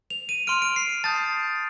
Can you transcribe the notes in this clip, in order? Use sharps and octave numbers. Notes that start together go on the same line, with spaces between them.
F7
D#7
C6 F6 D7
D7
C7
A5 D#6 G6 A6